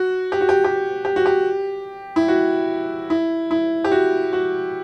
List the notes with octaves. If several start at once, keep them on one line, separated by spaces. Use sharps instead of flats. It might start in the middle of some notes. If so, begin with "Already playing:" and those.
Already playing: F#4
G4
F#4
G4
G4
G4
F#4
G4
E4
F#4
E4
E4
G4
F#4
F#4